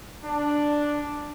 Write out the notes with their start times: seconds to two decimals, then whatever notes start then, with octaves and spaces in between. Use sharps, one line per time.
0.24 D4